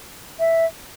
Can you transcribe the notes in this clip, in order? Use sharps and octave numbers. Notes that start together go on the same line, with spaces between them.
E5